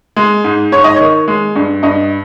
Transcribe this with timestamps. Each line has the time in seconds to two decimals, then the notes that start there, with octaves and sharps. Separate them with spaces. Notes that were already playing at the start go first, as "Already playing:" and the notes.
0.16 G#3
0.44 G#2
0.72 G#2 C#5
0.84 D#5
0.96 D#3 C#5
1.28 G#3
1.56 G2
1.83 G2 D#5